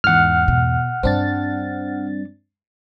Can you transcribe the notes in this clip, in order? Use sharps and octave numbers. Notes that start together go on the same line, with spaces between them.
E2 G#2 F#5 F6
B2
G2 G3 C4 D4 A6